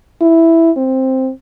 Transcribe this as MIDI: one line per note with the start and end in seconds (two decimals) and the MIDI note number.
0.21 0.71 64
0.77 1.30 60